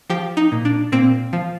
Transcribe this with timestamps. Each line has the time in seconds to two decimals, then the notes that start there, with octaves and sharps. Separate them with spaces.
0.10 F3 G4
0.37 D#4
0.52 A#2
0.65 D4
0.92 A#2 C4
1.33 F3